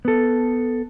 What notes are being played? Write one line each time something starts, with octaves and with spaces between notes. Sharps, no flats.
B3 A4